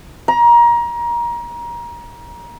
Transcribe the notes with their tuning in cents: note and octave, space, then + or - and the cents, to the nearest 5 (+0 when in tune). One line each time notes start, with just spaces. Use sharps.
A#5 +25